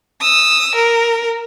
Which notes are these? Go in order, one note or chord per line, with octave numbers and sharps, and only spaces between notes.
D#6 E6
A#4